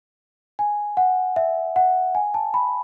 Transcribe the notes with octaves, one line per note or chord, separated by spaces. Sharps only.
G#5
F#5
E5
F#5
G#5
A5
B5